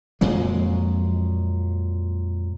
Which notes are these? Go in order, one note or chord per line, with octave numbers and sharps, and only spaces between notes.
F2 A#2 F#3 G#3